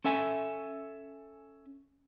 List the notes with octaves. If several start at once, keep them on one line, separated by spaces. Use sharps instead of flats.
C#4 A4 E5 G#5